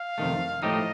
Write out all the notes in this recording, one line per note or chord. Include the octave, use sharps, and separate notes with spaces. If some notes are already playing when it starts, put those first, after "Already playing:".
Already playing: F5
F2 C3 D#3 A3
A2 F3 A3 D#4 G4 D#5